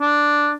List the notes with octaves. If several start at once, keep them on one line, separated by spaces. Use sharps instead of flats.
D4